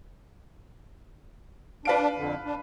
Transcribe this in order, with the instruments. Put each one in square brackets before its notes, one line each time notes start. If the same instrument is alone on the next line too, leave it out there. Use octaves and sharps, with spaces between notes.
[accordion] D4 [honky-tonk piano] B4 F5 D7
[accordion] F2 D3
D4